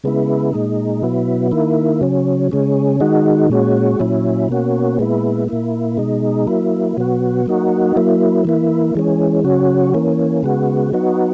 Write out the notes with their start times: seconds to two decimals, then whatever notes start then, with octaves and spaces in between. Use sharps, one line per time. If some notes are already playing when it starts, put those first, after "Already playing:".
0.04 C#3 G#3 B3 E4
0.53 A#2 G#3 D#4
1.03 B2 F#3 B3 E4
1.51 D#3 A#3 E4
2.01 C#3 F#3 C#4
2.52 C#3 G#3 C#4
3.00 D#3 G#3 D#4 F#4
3.50 A#2 G#3 C#4 F#4
4.00 A#2 F#3 C#4 E4
4.49 B2 A#3 C#4 F#4
4.99 A#2 G#3 B3 E4
5.48 A#2 A#3 E4
5.97 B2 G#3 D#4
6.47 F#3 A#3 E4
6.97 B2 F#3 B3 F#4
7.46 F#3 A#3 D#4 F#4
7.96 F#3 A#3 E4
8.45 E3 A#3 E4
8.95 E3 G#3 C#4
9.44 C#3 F#3 C#4 F#4
9.94 E3 A#3 C#4
10.43 C#3 G#3 B3 F#4
10.93 F#3 B3 D#4 F#4